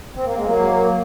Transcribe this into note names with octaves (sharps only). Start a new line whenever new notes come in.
C4
A#3
G#3
F#3 A#3